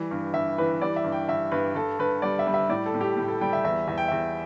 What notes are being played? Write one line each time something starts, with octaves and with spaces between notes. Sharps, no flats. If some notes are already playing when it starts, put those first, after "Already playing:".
Already playing: E3 G3
G2
G2 E5
E3 B4
G3 D5
E5
G2
G5
G2 E5
G2 B4
G2 A4
G2 B4
G3 D5
E5
G3
E5
A2 D5
A4
A2
G4
A2
A4
G3 G5
E5
E2 E5
E2 E5
G5
E2 E5